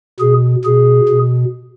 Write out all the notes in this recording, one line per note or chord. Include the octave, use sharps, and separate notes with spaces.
B2 G#4
B2 G#4
B2